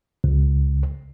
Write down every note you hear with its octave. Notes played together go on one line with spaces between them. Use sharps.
C#2